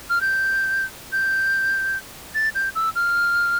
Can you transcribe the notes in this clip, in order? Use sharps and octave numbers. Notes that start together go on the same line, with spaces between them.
F6
G6
G6
A6
G6
E6
F6